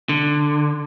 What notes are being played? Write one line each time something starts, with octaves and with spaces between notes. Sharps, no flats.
D3